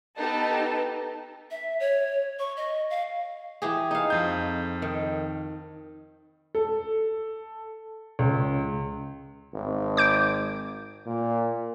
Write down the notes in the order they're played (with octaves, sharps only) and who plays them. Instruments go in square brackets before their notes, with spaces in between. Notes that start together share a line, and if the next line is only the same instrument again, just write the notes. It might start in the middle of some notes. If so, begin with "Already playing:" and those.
[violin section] B3 D#4 G4 A4 A5
[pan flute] E5
C#5
C#6
D#5
F5
[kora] E3 G4 G#4
D#4 F5
[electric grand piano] F2 G6
[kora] D#3
[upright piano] A4
C#2
[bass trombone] G#1
[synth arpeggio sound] D6 G6 D7
[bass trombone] A#2